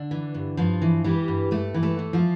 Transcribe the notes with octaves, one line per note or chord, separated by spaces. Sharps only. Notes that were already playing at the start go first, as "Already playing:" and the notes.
Already playing: D3 D4
E3
G2
G2 F3 F4
E3
E3 G3 G4
G2
G2 A3 A4
E3
A3 A4
E3
F3 F4